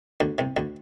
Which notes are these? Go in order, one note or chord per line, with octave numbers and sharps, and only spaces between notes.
D2 D3
C2 C3
D2 D3